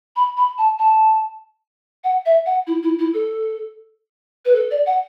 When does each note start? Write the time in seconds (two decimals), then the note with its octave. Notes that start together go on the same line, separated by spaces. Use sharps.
0.16 B5
0.37 B5
0.58 A5
0.79 A5
2.04 F#5
2.26 E5
2.46 F#5
2.67 E4
2.83 E4
2.99 E4
3.14 A4
4.45 B4
4.55 A4
4.71 D5
4.86 F#5